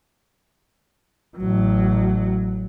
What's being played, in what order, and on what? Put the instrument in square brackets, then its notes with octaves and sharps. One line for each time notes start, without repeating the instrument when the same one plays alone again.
[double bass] A1 F#3